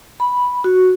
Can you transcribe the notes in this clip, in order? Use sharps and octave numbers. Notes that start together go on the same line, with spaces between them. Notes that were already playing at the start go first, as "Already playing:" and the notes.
B5
F#4